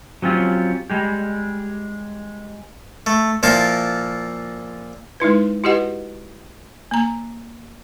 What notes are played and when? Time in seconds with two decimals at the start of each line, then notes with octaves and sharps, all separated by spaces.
0.22 F#3 C4 C#4 F4 G4
0.90 G3 G#3 G4
3.06 A3
3.43 A#2 F3 A#3 E4 A4 A#4
5.20 G#3 D#4 E4 B4
5.64 E4 F#4 G4 B4 D#5 F#5
6.91 A#3 A#5